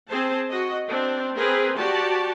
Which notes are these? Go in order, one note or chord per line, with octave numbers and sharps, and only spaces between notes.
C4 G#4 C5 A5
F#4 D#5
C4 D4
C4 G#4 A#4 B4
F#4 G4 D5 A5